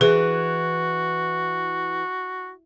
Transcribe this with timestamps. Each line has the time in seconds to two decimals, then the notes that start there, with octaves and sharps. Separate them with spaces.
0.01 E3 F#4 G#4